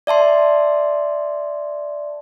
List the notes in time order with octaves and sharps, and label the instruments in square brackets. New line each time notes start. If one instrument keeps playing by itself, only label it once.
[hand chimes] D5 E5 A5 C6